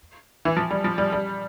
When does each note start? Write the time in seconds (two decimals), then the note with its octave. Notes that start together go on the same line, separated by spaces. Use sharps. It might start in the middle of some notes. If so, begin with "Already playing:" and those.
0.45 E3
0.56 F3
0.71 G3
0.84 F3
0.98 G3
1.12 G3